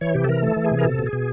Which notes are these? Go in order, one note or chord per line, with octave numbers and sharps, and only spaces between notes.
E3 C#5
C3 G4
A4
E3 A#4
A3 A4
E3
G#4
C3
A#4
B2 A4
B2
G#4
B2